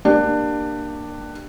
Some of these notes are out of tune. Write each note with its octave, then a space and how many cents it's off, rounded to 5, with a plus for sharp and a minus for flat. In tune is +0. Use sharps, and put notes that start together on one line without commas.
A#3 +0 D4 +20 G4 +0